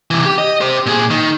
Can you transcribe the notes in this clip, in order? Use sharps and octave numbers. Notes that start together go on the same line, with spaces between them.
C3 E3
G4
D#5
G4 C5
A#2 G#4
D#3